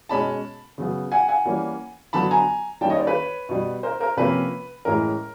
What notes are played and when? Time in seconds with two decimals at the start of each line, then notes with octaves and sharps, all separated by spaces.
0.09 B2 G#3 C#4 A5 B5
0.78 C#3 F#3 B3
1.12 F#5 G#5
1.28 F#5 G#5
1.45 E3 G3 A#3 C#4
2.13 D3 F#3 B3 A5 B5
2.31 G#5 A#5
2.81 D#3 G3 A#3 C#4 G5 A5
2.90 C#5 D#5
2.98 C5 D5
3.07 B4 C#5
3.49 B2 G3 B3
3.83 A#4 C5
4.00 A#4 C5
4.17 C3 F3 A#3 C#4 B4
4.85 A2 E3 G#3 C#4 A#4